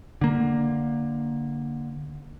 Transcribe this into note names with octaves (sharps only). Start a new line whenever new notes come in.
D3 A#3